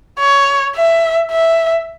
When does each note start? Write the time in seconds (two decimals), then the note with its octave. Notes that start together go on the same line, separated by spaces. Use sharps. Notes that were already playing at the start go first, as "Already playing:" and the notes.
0.20 C#5
0.76 E5
1.31 E5